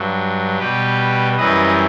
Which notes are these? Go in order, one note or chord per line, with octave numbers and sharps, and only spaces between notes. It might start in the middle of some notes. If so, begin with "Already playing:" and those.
Already playing: G2 F#3
B2 G3 G4 B4
F#2 E3 G3 B4 D#5